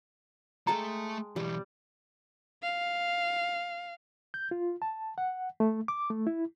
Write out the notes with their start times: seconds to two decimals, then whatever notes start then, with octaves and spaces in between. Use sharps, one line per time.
0.67 G#3 A3 A4 G5 A5 A#5
1.36 B1 E3 G3
2.63 F5
4.34 G6
4.51 F4
4.82 A5
5.18 F#5
5.60 A3
5.88 D6
6.10 A3
6.27 E4